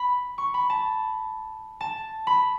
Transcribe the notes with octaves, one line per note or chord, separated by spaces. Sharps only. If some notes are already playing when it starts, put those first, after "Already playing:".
Already playing: B5
C#6
B5
A5
A5
B5